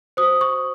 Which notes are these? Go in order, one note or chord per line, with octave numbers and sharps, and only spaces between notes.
F#4 C5 D#6
C#6